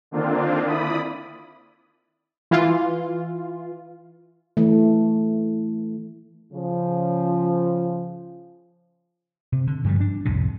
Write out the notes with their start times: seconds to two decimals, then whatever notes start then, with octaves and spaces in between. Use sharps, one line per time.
0.11 D3 D#3 A#3 C4 D4 F4
0.66 E4 D5 B5 D#6
2.51 E3 F4
4.57 E3 A3
6.53 C#3 F3
9.52 C3
9.67 D3
9.84 G2 F3 G3
10.00 D4
10.25 C2 F2 A2 C3